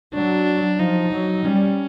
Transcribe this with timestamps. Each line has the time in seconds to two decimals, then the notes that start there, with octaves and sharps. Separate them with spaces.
0.14 F#3 D4
0.80 F3 D#4
1.12 F#3
1.45 G3 C#4